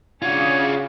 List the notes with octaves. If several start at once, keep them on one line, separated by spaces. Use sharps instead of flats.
C#3 C#4 D4 F4 F#4 G#5